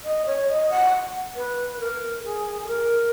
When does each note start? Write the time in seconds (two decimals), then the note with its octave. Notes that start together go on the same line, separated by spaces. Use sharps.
0.04 D#5
0.26 C#5
0.48 D#5
0.70 F#5
1.35 B4
1.80 A#4
2.24 G#4
2.62 G#4
2.67 A#4